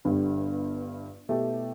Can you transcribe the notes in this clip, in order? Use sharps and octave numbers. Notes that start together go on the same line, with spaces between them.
G1 G2 D3 G3
B2 A3 E4 G4